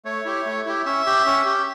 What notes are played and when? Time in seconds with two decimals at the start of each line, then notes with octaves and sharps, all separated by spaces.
0.05 A3 C#5
0.25 E4 G4
0.45 A3
0.66 E4 G4
0.85 C#4 E5
1.06 G4
1.26 C#4
1.46 G4